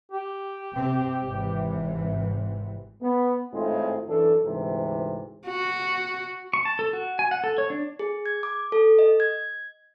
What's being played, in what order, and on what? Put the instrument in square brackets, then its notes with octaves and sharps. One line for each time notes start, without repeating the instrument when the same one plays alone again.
[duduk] G4
[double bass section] C3 C4
G#1 C3 E3
[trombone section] B3
G#1 A2 G#3 C4 D#4 F4
F#2 E3 D4 A4
D2 G#2 C3 E3 C4
[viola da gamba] F#4
[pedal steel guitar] C#6
A5
A4
F#4
G#5
F#5
A4
C#5
D4
[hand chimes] G#4
G#6
D6
A4
D#5
G#6